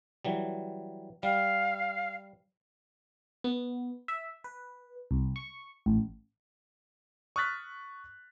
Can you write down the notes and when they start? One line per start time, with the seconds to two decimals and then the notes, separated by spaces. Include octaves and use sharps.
0.25 E3 F#3 G3
1.23 G3 F5
3.44 B3
4.08 E5
4.44 B4
5.11 C2
5.36 C#6
5.86 A1
7.36 C#6 D#6 F6 F#6 A6 B6